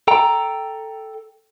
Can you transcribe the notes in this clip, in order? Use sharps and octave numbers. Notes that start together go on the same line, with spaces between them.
A4 G5 A#5